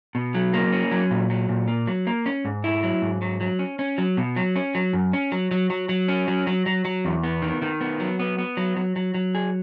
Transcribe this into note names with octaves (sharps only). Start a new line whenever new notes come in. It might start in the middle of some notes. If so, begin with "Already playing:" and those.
B2
F#3
A#3
C#4
F#3
A#2
F#3
A#2
A#3
F#3
A#3
C#4
G#2
E4
F#3
G#2
F#3
F#3
C#4
C#4
F#3
B2
F#3
C#4
F#3
F#2
C#4
F#3
F#3
F#3
F#3
C#4
F#3
F#3
F#3
F#3
E2
B3
D#3
D#3
B3
F#3
B3
B3
F#3
F#3
F#3
F#3
G#4